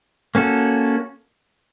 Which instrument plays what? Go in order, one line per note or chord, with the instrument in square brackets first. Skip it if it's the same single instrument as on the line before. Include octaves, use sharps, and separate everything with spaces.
[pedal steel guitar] A#3 C#4 F#4 A4